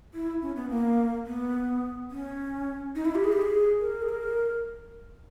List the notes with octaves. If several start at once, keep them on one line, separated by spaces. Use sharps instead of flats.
E4
C#4
B3
A#3
B3
C#4
D#4
E4
G4
G#4
G4
G#4
A#4
G#4
A#4